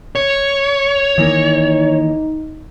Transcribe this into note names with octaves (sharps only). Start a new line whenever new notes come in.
C#5
D#3 E3 A#3 D#4